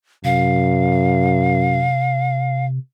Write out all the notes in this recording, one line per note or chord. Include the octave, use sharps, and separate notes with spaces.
F#2 C3 F5